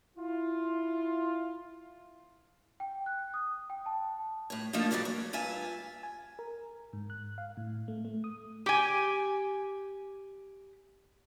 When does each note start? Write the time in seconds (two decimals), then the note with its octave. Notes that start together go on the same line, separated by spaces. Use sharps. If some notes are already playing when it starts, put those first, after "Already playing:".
0.17 E4 F4
2.80 G5
3.06 F#6
3.34 D#6
3.70 G5
3.86 A5
4.50 A2 C#5
4.73 F3 A3 A#3 D4 D#4 F4
4.91 A#2 D3 F#3 G3 C4 D5
5.05 C#5
5.33 G2 F4 E5 G#5
6.03 G#5
6.39 A#4
6.93 G#2
7.10 F#6
7.38 F5
7.57 A2
7.88 A3
8.05 A3
8.24 D#6
8.66 G4 G#5